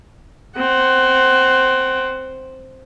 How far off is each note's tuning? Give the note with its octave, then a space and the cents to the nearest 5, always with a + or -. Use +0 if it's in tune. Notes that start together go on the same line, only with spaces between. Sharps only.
C4 +0 F#5 +20